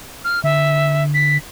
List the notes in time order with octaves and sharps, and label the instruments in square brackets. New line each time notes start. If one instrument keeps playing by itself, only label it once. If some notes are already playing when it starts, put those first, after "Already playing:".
[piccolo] F6
[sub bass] D3 [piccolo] E5
[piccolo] B6